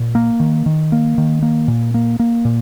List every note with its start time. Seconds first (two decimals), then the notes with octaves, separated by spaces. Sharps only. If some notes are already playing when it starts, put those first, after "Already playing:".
Already playing: A#2
0.15 A#3
0.40 D#3
0.66 D#3
0.92 A#3
1.18 D#3
1.42 A#3
1.68 A#2
1.94 A#3
2.19 A#3
2.45 A#2